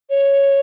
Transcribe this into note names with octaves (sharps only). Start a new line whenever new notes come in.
C#5